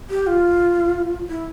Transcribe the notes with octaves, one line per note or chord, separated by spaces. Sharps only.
G4
F4
E4